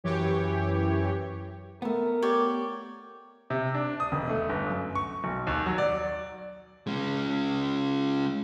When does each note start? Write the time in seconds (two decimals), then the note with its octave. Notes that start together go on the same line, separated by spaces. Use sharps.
0.04 F#2 E3 G4 C#5
1.82 A3 B3 A#4
2.22 G4 C#5 D5
3.50 C3
3.74 D4
4.00 D#6
4.12 E1
4.29 A3
4.49 G1
4.70 F#2
4.95 C#6
5.24 B1
5.47 D#2
5.66 F#3
5.78 D5
6.87 G#3 C#4